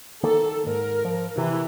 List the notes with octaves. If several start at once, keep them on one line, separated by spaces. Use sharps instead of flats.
D#3 A#3 A4
G#2 A#4
F3
C3 E3